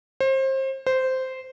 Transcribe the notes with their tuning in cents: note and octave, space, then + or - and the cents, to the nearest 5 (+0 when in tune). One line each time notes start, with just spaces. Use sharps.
C5 +30
C5 -10